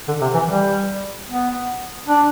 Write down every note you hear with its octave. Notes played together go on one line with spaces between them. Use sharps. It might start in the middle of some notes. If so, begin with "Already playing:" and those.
D3
C3
E3
G3
B3
D4